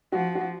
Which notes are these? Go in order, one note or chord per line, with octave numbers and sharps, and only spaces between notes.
F3 F#4
F#4